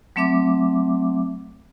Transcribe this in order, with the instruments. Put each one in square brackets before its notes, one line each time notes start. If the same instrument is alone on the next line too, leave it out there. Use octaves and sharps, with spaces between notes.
[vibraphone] F#3 A3 C4 E5 D6